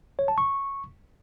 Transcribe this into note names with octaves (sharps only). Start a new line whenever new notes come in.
C#5
A5
C#6